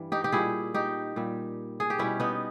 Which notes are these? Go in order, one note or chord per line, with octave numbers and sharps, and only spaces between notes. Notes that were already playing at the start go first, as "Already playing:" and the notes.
Already playing: G2 E3 G3
D#4 G4
G4
A#2 G3 E4 G#4
D#4 G4
A#2 G3
G#4
G4
B2 G3 C#4 E4
B3 D#4